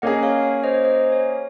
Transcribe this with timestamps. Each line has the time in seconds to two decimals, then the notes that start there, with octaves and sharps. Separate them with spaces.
0.02 A#3 C#4 G#4 D#5 F#5
0.23 C#5 F5
0.43 C#5
0.64 C5 D#5
0.84 C5 D#5
1.12 C#5